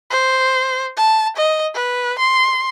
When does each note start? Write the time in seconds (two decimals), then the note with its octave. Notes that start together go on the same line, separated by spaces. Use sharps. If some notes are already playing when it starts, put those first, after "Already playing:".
0.10 C5
0.97 A5
1.36 D#5
1.74 B4
2.19 C6